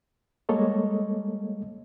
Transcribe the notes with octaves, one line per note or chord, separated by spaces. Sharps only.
G3 G#3 A#3 A4 C#5 D#5